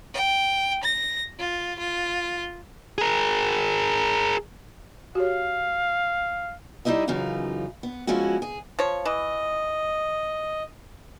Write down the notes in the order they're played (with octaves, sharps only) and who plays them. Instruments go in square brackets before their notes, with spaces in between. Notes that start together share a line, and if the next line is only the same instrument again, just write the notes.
[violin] G5
A#6
F4
F4
[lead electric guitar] G#4 A#4
[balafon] F#4 G4 C#5 [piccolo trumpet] F5
[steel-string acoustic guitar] G3 D#4 E4 D#5 E5
F#2 C#3 E3 D#4 F4
B3
F3 G#3 C#4 E4 F#4
G#4
[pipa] F3 C#5
[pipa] E3 [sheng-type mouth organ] D#5